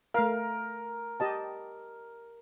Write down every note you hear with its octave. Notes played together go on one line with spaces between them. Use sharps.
A3 A#4 F5
G4 D#5 A5